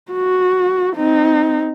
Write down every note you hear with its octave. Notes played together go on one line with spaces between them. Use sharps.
F#4
C4 D#4